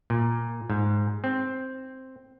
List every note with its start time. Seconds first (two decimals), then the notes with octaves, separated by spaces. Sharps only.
0.10 A#2
0.70 G#2
1.24 C4